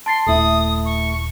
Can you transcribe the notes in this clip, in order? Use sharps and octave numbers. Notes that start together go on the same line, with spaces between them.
A5 C6 A6 C7
D#1 A3 E4 D#6
C#6